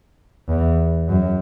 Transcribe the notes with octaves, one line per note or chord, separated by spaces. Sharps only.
E2
F#2